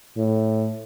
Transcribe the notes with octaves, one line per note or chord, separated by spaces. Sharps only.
A2